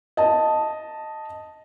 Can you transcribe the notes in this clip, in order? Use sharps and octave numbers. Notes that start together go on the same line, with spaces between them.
D#5 A5